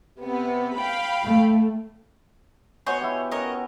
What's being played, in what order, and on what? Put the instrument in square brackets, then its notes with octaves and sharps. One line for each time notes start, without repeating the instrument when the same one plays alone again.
[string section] C3 B3
F5 G5 B5
[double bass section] A3
[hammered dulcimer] B3 F#4 G#5 [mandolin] C5 C#5 D#5
[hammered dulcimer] E4 F#4 G4
[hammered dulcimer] C#4 B4 [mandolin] A#4 C#5 D#5